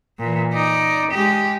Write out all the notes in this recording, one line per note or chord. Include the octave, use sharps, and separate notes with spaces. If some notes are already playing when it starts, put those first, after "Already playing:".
A#2 E3
D#4 D5
G#3 G4